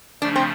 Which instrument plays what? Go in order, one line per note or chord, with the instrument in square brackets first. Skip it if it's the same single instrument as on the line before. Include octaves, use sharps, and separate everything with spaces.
[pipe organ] C#3 F3 A3 [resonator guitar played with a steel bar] D4
[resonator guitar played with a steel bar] C4